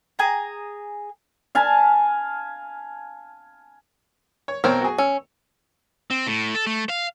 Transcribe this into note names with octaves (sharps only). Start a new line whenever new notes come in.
G#4 G#5 A#5
F5 G#5 A5 B5
C#5
B1 C4 A#4 C5 C#5
F#4 G#4
C#4 E6
C4
A2
A4
A3
F5